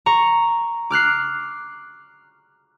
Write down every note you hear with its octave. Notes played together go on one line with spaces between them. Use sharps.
A#5 C#6
D6 F6 F#6 C7